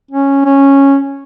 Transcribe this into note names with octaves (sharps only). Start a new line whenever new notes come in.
C#4
C#4